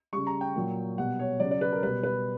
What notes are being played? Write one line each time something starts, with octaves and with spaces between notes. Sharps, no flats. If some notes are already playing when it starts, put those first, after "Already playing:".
C#3 G3 C#6
A#5
G5
A#2 F#3
B2 G3 F#5
C#5
C#3 F#3 D5
D5
B4
A#4
B2 G3 B4
B4